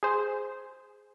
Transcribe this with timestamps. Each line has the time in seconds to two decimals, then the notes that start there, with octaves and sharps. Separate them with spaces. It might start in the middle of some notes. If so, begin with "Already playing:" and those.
0.03 G#4 C5